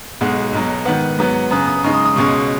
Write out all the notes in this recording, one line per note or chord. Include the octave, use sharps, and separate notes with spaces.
B1 B2 G#3 F#5
B1 B2 F#3
G#2 D#3 B3 F#5
G#2 F#3 B3
F#2 C#3 B3 D#6
D#6
F#2 C#3 G#3 D#4 C#6
D#6
D#6
C#2 B2 G#3 C#4 C#6